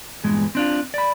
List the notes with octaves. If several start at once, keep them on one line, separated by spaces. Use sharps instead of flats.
E2 G2 A#2 G#3
C4 D4 F4
D5 B5